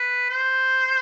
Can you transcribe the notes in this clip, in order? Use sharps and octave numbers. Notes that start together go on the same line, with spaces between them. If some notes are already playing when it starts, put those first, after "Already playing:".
Already playing: B4
C5